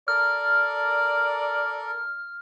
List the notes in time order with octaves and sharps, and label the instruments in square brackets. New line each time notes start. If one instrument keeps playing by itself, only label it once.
[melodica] A4 A#4 [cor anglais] D5 [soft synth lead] F6